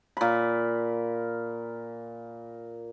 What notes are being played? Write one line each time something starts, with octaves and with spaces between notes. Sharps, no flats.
A#2 B5